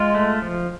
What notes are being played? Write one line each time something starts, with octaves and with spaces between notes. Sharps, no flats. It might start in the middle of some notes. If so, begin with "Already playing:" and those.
Already playing: G#3 F4
A3
F3